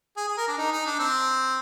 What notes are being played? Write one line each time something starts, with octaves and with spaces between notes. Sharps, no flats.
G#4
G#4
A#4
D4
D#4
D#4
D4
C4